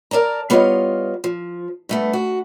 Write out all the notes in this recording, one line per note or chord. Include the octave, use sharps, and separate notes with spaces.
A#4 D5 A5 A#5
G3 B3 F4 C#5 D#5 F5
F3
G2 A3 B3
F#4